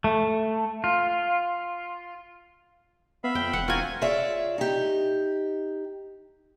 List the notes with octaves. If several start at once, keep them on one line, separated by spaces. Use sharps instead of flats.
A3
F4
B3 E5 F5 B5
F2 G5
E1 F#5
C4 F4 F#4 A#4 G#5
F4 G#4 C#5 D5 E5
D#4 G4